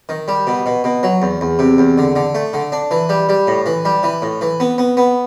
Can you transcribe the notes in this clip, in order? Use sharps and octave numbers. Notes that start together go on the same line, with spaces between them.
D#3
G3
B2
B2
B2
F#3
E2
E2
C3
E2
D3
D3
A3
D3
D4
E3
G3
G3
A2
E3
G3
E3
A2
E3
B3
B3
B3